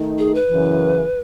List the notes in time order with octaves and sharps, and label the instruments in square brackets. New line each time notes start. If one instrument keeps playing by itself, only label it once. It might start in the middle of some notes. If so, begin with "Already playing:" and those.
Already playing: [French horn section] D#3 A3 D#4
[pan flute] G#4
B4
[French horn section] F#2 C#3 E3